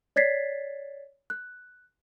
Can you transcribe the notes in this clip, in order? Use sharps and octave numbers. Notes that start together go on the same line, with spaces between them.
C#5 D5 G#6 A6 B6 C7
F#6